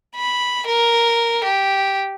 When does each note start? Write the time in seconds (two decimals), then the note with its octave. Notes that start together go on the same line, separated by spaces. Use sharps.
0.16 B5
0.66 A#4
1.44 G4